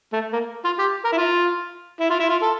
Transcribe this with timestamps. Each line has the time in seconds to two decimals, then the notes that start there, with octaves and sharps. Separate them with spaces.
0.13 A3
0.33 A#3
0.65 F4
0.79 G4
1.05 A#4
1.12 E4
1.17 F4
2.00 E4
2.10 F4
2.20 E4
2.30 F4
2.42 A4